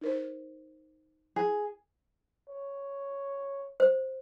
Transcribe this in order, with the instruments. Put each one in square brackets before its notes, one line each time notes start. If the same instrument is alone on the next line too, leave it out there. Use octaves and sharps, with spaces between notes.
[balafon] D#4 A#4 C5
[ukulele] G#4
[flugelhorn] C#5
[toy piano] C5